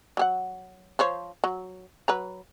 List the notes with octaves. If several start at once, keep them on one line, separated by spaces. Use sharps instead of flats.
F#3 G4 F#5
F3 C5 C#5
F#3
F#3 B4 A#5